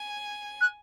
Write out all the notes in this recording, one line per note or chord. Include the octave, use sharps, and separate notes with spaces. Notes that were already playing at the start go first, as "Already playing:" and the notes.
Already playing: G#5
F#6